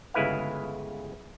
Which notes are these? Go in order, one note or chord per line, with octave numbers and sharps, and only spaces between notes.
G1 C#3 G#3 E4 B4 F5